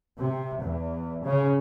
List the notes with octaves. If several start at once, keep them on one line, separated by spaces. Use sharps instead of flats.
C3
E2
C#3